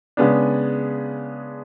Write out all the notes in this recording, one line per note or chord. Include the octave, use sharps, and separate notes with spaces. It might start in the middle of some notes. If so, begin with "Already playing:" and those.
C#3 G#3 B3 D4